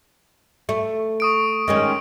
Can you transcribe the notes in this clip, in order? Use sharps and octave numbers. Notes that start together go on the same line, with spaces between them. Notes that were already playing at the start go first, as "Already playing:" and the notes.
A3
C#6 D#6 D7
D#3 G#3 C#4